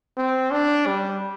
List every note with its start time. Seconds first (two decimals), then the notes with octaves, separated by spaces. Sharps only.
0.17 C4
0.51 D4
0.86 G3